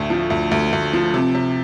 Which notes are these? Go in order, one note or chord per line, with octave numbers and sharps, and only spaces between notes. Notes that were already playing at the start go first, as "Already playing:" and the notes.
Already playing: D2 A2
F3
D2
D2
D2
F3
C3
C3